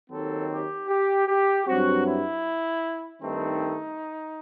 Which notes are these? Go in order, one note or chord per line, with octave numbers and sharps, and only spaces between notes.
D#2 D#3 F#3 C4 A4
G4
G4
G4
G2 F#3 C4 F#4
E4
G2 D#3 A3 C4 D#4